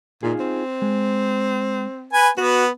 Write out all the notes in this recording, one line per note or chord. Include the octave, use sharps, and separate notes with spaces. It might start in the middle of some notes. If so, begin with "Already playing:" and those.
A#2 D#4 F4 G#4
C4
G#3
B4 G#5
B3 F#4 B4